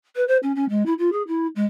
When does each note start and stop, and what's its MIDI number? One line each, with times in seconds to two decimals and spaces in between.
0.15 0.26 71
0.27 0.37 72
0.42 0.52 61
0.55 0.65 61
0.69 0.85 56
0.85 0.93 64
0.98 1.12 65
1.12 1.22 68
1.27 1.47 64
1.55 1.65 56